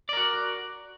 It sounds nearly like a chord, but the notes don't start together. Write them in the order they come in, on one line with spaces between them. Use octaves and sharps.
D5 A#4 F#4